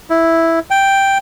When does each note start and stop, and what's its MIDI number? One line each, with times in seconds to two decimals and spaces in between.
0.10 0.59 64
0.71 1.18 79